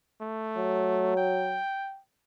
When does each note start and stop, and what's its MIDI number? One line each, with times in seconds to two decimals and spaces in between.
0.21 1.13 57
0.57 1.59 54
1.17 2.00 79